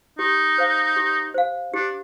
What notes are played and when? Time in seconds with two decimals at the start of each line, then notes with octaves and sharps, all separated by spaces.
0.19 D#4 G4
0.58 C5 F5
0.96 G4
1.34 C5 F5
1.74 D4 G4